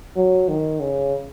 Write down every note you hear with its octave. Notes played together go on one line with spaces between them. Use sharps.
F#3
D#3
C#3